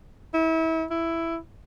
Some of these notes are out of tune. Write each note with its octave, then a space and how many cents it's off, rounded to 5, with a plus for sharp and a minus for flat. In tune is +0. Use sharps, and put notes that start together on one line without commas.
E4 -30
E4 +5